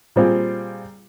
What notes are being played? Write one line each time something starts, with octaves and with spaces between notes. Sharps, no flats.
A#2 G3 C4 F4 G#4